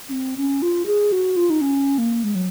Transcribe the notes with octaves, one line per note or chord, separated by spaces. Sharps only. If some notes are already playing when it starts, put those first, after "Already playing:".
C#4
C4
C#4
F4
G#4
F#4
F4
D#4
C#4
A#3
G#3
F#3